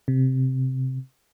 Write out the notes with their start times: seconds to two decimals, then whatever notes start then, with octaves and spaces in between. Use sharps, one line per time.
0.08 C3